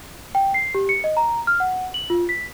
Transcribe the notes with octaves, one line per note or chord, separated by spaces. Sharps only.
G5
C7
G4
C#7
D#5
A#5
F6
F#5
F#7
F4
B6